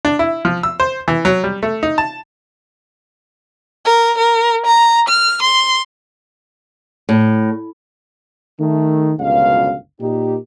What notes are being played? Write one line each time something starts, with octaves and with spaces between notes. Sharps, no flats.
D4
E4
F3
E6
C5
E3
F#3
G3
A3
D#4
A5
A#4
A#4
A#5
F6
C6
A2
D#3 A3
G1 C#2 F#2 B2 F5
A#2 D#4 G4